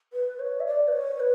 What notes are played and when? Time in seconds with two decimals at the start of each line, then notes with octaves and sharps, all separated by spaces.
0.13 B4
0.39 C#5
0.60 E5
0.66 D5
0.88 B4
0.92 C#5
1.20 B4